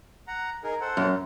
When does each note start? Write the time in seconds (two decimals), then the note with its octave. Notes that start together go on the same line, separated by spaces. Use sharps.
0.28 F#5 A#5
0.64 D#4 G#4 A#4
0.81 A4 C5 F#5
0.97 F#2